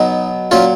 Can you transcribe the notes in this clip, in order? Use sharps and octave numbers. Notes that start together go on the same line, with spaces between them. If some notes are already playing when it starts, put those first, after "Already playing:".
Already playing: B2 F#3 D#4
A#2 F#3 C#4 F4